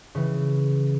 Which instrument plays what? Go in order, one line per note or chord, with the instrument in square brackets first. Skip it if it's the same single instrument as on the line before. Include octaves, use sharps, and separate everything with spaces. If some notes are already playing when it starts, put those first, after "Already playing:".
[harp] C#3 E3